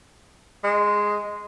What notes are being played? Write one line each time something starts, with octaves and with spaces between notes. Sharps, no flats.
G#3